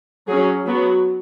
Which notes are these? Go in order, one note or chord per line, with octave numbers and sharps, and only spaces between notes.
F#3 C#4 G#4
F#3 B3 F#4